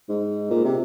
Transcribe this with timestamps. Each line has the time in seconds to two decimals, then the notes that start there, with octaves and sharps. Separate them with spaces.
0.09 G#2
0.50 A#2
0.64 C3